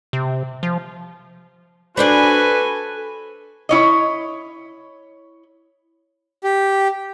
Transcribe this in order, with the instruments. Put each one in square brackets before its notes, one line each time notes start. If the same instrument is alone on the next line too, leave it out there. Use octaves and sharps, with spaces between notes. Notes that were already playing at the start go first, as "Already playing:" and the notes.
[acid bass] C3
F3
[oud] D4 C5 D5 [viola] F#4 G#5 [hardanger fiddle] A4 [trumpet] B4
[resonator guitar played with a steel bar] E4 C#5 D#5
[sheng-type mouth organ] G4